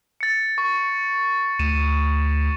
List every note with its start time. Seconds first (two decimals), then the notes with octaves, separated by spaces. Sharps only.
0.21 A6 C#7
0.58 C#6
1.59 D2 D#7 E7